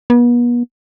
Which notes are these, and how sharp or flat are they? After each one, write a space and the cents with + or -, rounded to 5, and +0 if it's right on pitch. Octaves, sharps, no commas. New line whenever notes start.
B3 -40